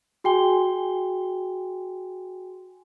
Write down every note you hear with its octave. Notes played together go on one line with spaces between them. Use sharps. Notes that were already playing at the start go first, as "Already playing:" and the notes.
F#4 G#4 G5 G#5 C6 G7